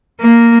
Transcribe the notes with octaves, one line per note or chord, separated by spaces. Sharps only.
A#3